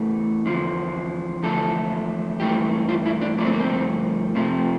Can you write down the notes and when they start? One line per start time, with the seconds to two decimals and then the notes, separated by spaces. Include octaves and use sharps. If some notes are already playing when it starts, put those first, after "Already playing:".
Already playing: E2 E3 A3
0.46 E2 D3 F3
1.43 E2 D3 F3 A3 A4
2.40 G2 E3 A3 G4
2.89 F4
3.06 E4
3.21 D4
3.38 G2 F3 A3 D4
3.45 C4
3.52 A#3
3.60 C4
4.35 F2 C3 F3 A3